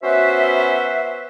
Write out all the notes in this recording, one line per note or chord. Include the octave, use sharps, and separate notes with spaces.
B3 C#4 F#4 B4 C5 E5